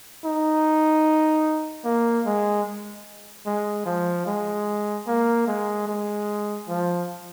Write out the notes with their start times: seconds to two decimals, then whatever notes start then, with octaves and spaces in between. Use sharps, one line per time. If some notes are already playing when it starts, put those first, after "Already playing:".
0.24 D#4
1.84 A#3
2.26 G#3
3.47 G#3
3.86 F3
4.26 G#3
5.07 A#3
5.47 G#3
5.87 G#3
6.68 F3